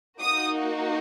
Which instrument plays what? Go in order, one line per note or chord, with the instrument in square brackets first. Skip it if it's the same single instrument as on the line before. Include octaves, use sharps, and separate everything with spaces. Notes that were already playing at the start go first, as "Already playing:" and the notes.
[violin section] A#3 D#4 F#4 D#6